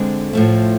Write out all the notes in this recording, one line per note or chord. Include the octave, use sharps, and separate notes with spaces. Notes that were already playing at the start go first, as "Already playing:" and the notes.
Already playing: D3 G#3 C4 G#4
A2 F3 A3